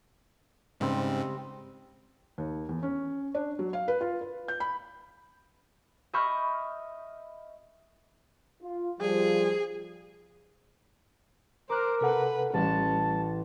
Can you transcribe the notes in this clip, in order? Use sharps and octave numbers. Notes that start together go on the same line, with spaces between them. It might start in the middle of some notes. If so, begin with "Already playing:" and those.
G#2 C#3 G3 C4
D#2
E2
C#4
D4
F#3
F5
B4
F4
B4
G6
B5
D#5 E5 B5 C#6 F6 G6
F4
F3 G3 G#4
A#4 C5 D6 F#6
C3 A4 B4 F#5
A1 G3 C#4 A5